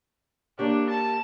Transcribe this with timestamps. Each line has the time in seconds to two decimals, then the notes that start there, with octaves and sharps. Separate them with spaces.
0.59 A#3 D4 G4 C#5
0.89 A5